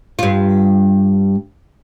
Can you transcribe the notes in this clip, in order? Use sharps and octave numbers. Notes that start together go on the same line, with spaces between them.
G2 F4